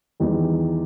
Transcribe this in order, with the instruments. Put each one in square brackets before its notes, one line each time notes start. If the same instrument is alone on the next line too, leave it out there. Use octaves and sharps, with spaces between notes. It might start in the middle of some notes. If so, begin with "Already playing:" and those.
[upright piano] E2 D#3 G3